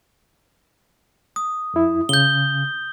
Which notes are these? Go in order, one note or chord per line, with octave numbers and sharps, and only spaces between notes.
D#6
F2 E4
C#3 G6 G7